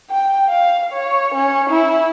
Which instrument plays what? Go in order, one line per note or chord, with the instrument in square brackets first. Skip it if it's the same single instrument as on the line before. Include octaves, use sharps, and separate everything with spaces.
[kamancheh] G5
F5
C#5
C#4
E4